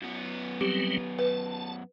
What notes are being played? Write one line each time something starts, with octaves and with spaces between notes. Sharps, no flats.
F#2 B3
F#3 G3 C4 G4
B4 A5